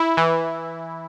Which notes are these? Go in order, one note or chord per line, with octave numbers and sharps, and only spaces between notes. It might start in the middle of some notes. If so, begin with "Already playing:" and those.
Already playing: E4
E3